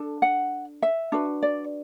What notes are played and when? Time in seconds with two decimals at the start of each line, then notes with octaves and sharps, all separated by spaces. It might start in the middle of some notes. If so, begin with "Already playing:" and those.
Already playing: D4 A4
0.22 F#5
0.82 E5
1.12 D4 F#4 B4
1.43 D5